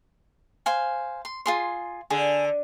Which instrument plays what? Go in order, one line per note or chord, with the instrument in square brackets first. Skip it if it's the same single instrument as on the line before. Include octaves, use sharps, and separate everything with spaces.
[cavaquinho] C5 F5 G#5
C6
F4 G#4 C6
[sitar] D3 [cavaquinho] G#4